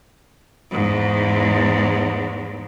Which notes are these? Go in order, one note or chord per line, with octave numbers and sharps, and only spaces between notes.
E2 G#2